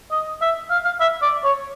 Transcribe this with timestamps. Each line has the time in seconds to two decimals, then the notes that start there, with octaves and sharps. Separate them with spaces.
0.11 D#5
0.41 E5
0.70 F5
0.85 F5
1.00 E5
1.22 D5
1.44 C#5